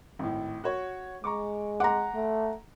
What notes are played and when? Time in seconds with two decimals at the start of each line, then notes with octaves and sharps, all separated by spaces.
0.19 G#1 A2
0.64 F#4 C#5
1.24 G#3 A#5 C#6 D6
1.80 F#5 A#5 C6 D6
2.14 A3